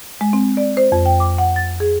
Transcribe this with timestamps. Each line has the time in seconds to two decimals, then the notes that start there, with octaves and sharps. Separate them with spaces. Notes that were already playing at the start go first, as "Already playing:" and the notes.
0.21 G#3
0.33 C4
0.57 D5
0.77 C5
0.92 F2
1.06 G5
1.20 D6
1.38 F#5
1.56 A6
1.80 G#4